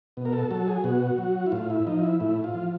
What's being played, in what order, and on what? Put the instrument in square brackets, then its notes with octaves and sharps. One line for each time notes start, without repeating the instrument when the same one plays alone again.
[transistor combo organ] B2
A#4
A4
F#3 A4
G#4
B2 F#4
F#3
E4
A2 F4
E4
F3 D#4
E4
A2 E4
F4
F3